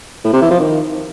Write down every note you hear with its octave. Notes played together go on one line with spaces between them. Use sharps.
A2
C3
E3
F3
D#3